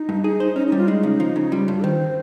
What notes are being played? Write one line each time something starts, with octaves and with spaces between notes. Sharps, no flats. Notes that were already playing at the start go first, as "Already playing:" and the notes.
Already playing: D#4
G2
G#4
C5
C#4 D#4
D#4
G3
F4
G#3 D#4
C#3
F3
C#3
G3 F4
G2
D#3 C5